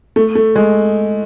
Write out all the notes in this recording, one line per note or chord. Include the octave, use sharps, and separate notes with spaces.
A3
A3
G#3